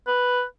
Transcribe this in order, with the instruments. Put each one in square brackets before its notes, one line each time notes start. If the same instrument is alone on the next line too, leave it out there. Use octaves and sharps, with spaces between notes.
[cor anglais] B4